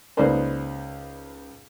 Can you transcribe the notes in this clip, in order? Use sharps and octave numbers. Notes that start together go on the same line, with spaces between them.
C#2 A#3 D#4 B4 C5 D5